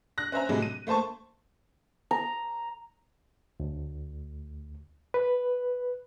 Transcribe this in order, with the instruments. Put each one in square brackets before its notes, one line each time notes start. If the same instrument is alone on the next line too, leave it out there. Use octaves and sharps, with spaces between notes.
[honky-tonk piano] F#6 A#6
C#4 C5 E5 A#5
A2 C3 F#3 G#3
D#7
A3 A#3 C5 A5 C#6
[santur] A#5
[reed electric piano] D2
B4